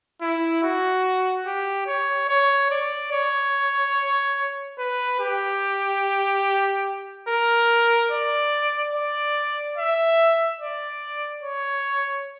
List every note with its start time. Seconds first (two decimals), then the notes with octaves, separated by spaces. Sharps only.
0.21 E4
0.63 F#4
1.46 G4
1.87 C#5
2.29 C#5
2.71 D5
3.12 C#5
4.78 B4
5.20 G4
7.28 A#4
8.11 D5
8.94 D5
9.77 E5
10.60 D5
11.43 C#5